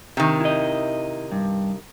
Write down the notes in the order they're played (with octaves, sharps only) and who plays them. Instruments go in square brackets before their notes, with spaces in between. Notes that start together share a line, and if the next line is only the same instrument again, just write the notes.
[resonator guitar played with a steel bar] C3 D#3
[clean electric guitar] E4 D#5
G2